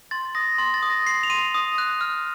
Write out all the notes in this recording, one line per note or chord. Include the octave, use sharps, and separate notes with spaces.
C6 A6
D#6 A#6
C6 A6
A6
D#6
A#6
C6 C7
F7
C6 D#7
D#6
F#6
F6